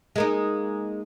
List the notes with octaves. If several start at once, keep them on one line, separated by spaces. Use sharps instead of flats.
G#3 A#3 D#4